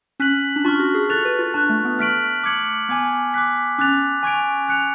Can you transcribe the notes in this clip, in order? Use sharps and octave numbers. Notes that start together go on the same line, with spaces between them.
C#4 F#6 B6 F#7
D4
F4 A5 C#6 F6
F#4
G#4
A4 C#6 F#6 A6 F7
B4
F4
D4 A5 C#6 F#6
A3
B3
A3 F6 B6 D7 F#7
D6 G#6 C#7 F#7
B3 G#5 D6 G#6
D6 F#6 B6
C#4 D6 F#6 A6 F7
G#5 C#6 G#6 D7 F7
F#6 C#7 F7